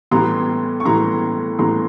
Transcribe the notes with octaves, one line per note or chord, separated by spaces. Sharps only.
A2 E3 G3 B3 A#5 C6
C#6
A2 E3 G3 B3 A#5 C6
A2 E3 G3 B3 A#5 C6